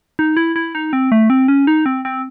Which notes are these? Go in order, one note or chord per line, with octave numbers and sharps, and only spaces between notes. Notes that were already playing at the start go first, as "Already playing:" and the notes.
D#4
E4
E4
D#4
C4
A3
C4
C#4
D#4
C4
C4